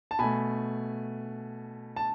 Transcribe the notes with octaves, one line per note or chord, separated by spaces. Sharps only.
A5
B2 A3 G#5 B5
A5